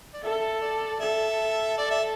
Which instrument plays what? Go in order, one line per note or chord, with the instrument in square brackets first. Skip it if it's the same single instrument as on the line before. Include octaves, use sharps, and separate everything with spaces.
[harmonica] D5
[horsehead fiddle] A4 [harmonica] E5
[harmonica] D5
[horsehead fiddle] A4 [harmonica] E5
[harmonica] D5
E5